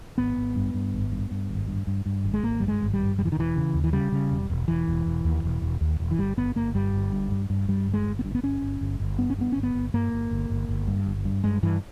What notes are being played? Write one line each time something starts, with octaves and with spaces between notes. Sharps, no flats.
G#1 B3
G#1
G2
G2
G#1
G2
G2
G#1
G2
G2
G2
G#1
G#3
G#1 A#3
G2 G3
G#3
G#1
G3
G2
E1 G3
E3
D#3
E1 E3
C#3
D#2
E3
C#3 G3
C#3
E1
E1
E1 E3
E1
E1
D#2
E1
E1
D#2
E1
E3
G1 G3
G1 B3
G1 A#3
G2 G3
G1
G2
G2
G2
G2 G3
G1
G#3
G1
B3
G2
B3
G1 C#4
G1
G1
G1
G2 B3
C#4
G2 B3
G1 C#4
B3
G1
G2 A#3
G1
G1
G1
G1
G2
G1
G2
G2 G#3
G2 E3